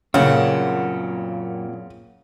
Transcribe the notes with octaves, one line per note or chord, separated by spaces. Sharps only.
F#2 A#2 C#3 A#3 C4 F#5